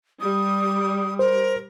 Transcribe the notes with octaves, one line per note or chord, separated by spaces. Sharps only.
G3 D#6
A#4 C5